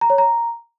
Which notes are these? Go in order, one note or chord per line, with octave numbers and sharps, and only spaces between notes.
A#5
C#5
A#5